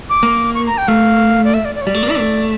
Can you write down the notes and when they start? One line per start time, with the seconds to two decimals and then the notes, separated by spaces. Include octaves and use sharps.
0.10 D6
0.23 A#3
0.55 C#6
0.66 A#5
0.78 G5
0.88 A3 F5
1.44 D5
1.54 E5
1.65 D5
1.75 D5
1.81 C#5
1.86 G3 D5
1.94 A3
2.03 A#3
2.10 E4
2.19 A3